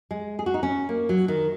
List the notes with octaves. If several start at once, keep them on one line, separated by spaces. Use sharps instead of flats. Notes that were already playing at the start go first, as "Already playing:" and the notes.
G#3
G#4
F#4
D#4
C#4
A#3
F#3
D#3